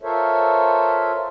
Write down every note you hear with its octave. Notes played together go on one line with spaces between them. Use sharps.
F4 A4 A#4 C5 C#5 E5